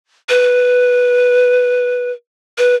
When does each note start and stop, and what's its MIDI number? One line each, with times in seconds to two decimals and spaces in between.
0.29 2.12 71
2.58 2.75 71